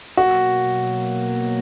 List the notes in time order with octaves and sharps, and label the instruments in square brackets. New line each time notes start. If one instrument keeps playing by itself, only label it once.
[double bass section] B2 F#3 A#3 [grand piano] F#4